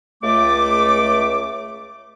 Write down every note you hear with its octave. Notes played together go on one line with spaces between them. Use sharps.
C#2 A3 D6